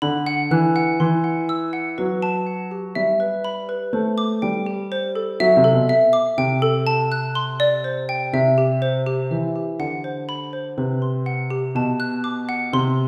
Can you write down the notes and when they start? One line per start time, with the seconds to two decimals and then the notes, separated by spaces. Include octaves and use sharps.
0.02 D3 B5
0.27 F#5
0.51 E3 F#6
0.76 F#5
1.00 E3 C6
1.24 F#5
1.49 E6
1.73 F#5
1.98 F#3 B4
2.22 A5
2.47 F#5
2.71 G4
2.95 G3 E5
3.20 B4
3.44 B5
3.69 B4
3.93 A3 C5
4.18 D6
4.42 G3 G5
4.66 G4
4.92 C5
5.15 A4
5.40 F#3 E5
5.57 C3
5.64 A4
5.72 B2
5.89 E5
6.13 D6
6.38 C3 G5
6.62 A4
6.87 A5
7.12 F#6
7.35 C6
7.60 D5
7.84 C5
8.09 G5
8.33 C3 E5
8.58 G4
8.82 C5
9.06 G4
9.31 E3 E5
9.56 G4
9.79 D3 F#5
10.04 C5
10.29 B5
10.53 C5
10.78 C3 B4
11.02 C6
11.26 F#5
11.50 G4
11.75 B2 A5
12.00 F#6
12.24 D6
12.49 F#5
12.73 C3 C6